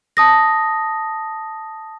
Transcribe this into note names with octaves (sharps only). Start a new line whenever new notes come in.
A5 D#6 A#6